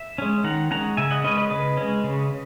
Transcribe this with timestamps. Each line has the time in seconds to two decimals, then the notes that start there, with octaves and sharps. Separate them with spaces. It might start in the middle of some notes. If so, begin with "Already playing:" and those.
Already playing: E5
0.18 G#3 C#4
0.44 D#3 F#5 A#5
0.71 G#3 C#4 F#5 A#5
0.97 C#3 E5 G#5
1.11 D#5 F#5
1.24 G#3 C#4 B4 D#5
1.37 B4 D#5
1.50 C#3 B4 D#5
1.77 G#3 C#4
2.04 C#3